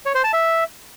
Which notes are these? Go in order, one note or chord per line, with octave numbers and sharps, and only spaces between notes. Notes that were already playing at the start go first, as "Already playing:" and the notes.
C#5
C5
A5
E5